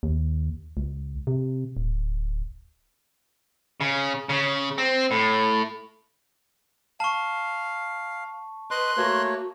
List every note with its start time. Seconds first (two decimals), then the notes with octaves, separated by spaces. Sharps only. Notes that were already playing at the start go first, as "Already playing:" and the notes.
0.03 D#2
0.77 C#2
1.27 C3
1.77 D1
3.81 C#3
4.29 C#3
4.78 C4
5.11 A2
7.00 F5 A5 C#6
8.71 B4 D#5 C6 F#6
8.97 A3 A#3 F#4 C#5